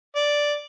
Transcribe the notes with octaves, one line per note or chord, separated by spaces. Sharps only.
D5